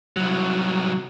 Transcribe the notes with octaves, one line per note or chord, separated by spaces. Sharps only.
C2 F#3